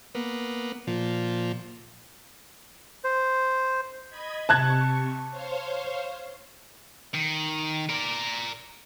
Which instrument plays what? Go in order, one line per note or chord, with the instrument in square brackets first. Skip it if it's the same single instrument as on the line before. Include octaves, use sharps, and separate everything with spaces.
[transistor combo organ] A#3 B3
A#2 F3
[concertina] C5
[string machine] D#5 B5 G#6
[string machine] C3 C#6 [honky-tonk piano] A5 F#6 G#6
[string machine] C5 C#5 F5
[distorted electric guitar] D#3
A#4 D5